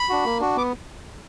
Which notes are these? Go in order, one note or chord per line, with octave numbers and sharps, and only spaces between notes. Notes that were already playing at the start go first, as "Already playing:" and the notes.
Already playing: B5
D4 F#4
A#3
D4 F#4
B3 D6